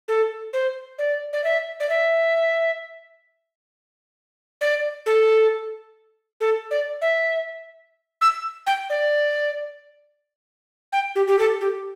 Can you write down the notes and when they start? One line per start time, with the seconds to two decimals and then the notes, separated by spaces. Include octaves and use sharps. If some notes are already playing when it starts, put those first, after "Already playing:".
0.08 A4
0.53 C5
0.99 D5
1.33 D5
1.44 E5
1.80 D5
1.89 E5
4.61 D5
5.06 A4
6.41 A4
6.71 D5
7.02 E5
8.21 E6
8.67 G5
8.90 D5
10.93 G5
11.15 G4
11.28 G4
11.39 A4
11.61 G4